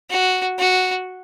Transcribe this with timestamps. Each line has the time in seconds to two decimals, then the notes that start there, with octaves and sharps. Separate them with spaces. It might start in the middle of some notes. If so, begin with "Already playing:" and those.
0.10 F#4
0.59 F#4